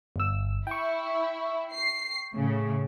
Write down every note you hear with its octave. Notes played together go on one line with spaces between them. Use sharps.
G1 E6
E4 G5 C#6
C7
A2 C#3